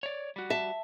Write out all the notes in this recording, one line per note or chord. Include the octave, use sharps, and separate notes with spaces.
C#5 D5
G3 F#4
E5 A5